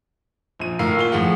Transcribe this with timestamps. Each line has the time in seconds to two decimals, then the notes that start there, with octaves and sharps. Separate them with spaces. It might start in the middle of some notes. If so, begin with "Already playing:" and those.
0.59 A#1 D#7
0.79 A2 A#4 F5 E6 C7
0.97 A#2 F4 G7
1.12 A2 F3 G#4 F#5